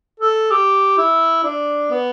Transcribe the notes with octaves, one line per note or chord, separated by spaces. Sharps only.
A4
G4
E4
D4
B3